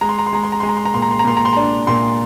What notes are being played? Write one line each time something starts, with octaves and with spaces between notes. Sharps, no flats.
G#3 A#5
C6
A#5
C6
G#3 A#5
C6
A#5
G#3 C6
A#5
C6
A#5
A#2 C6
A#5
C6
A#5
A#2 C6
A#5
C6
D4 A#5
A#2 C6